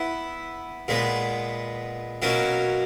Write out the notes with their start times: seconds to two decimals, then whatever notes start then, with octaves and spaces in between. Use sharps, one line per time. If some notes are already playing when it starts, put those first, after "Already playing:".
Already playing: B3 E4 B4 E5
0.88 A#2 G#3 B3
2.22 B2 F#3 A#3 C#4